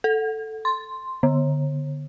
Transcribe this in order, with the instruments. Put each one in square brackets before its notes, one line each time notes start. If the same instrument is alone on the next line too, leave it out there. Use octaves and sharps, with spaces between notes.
[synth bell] A4
C6
D3